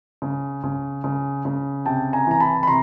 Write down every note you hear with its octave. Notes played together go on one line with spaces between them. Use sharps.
C#3
C#3
C#3
C#3
C3 G5 A5
G#5 A#5
E3 A#5
A5 B5
B5
C3 A#5 C6